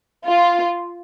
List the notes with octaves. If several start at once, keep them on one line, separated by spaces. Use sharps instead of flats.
F4